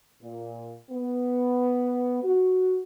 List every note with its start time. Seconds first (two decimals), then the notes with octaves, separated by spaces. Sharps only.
0.22 A#2
0.89 B3
2.23 F#4